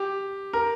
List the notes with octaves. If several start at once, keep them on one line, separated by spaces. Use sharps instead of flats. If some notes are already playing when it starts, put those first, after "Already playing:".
Already playing: G4
A#4